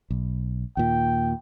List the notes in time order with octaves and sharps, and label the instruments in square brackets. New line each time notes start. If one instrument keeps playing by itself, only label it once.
[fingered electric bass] B1
[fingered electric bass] D#2 A#2 [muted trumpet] G5